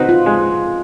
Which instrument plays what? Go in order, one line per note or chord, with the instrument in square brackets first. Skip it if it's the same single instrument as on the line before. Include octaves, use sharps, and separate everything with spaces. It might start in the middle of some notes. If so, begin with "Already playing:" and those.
Already playing: [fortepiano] C4 D#4 F#4 B4
[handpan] F4
[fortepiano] G#3